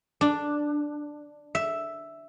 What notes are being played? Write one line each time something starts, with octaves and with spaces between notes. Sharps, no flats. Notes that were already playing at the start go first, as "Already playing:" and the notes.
D4
E5